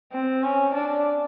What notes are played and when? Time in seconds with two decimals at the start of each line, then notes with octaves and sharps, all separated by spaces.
0.12 C4
0.43 C#4
0.74 D4